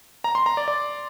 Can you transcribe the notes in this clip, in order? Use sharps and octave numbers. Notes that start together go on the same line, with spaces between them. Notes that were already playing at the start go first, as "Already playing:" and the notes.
A#5
C6
A#5
D5
D5